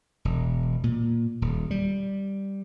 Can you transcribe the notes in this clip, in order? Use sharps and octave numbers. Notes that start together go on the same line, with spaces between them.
E1
A#2
D#1
G3